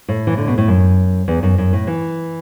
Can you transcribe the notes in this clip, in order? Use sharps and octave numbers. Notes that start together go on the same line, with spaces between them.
A2
E3
D3
B2
A2
F#2
E2
F#2
F#2
A2
E3